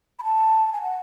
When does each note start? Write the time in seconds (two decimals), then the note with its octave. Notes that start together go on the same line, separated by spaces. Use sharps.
0.19 B5
0.24 A5
0.73 G#5
0.82 F#5